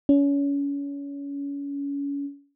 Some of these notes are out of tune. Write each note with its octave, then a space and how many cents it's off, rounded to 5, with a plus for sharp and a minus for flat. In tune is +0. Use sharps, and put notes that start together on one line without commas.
C#4 +30